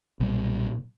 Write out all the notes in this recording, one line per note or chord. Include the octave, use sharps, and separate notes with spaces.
B1 A#2 G3